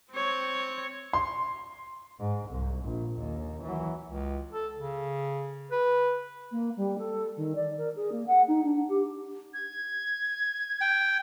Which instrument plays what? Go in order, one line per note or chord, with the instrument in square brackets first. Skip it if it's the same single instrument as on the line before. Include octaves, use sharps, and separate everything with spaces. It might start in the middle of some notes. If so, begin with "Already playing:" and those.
[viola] C4 C#5
[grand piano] C6
[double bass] G#2
C2
A#1
D#2
E3 F#3
[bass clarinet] C#2
A4
C#3
B4
[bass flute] A#3
G3
A4
D#3
D5
A#4
G#4
A#3
F#5
D#4
D4
G4
[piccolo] G#6
[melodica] G5